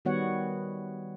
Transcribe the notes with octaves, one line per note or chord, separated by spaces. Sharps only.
D#3 G3 B3 F#4 C#5 F#5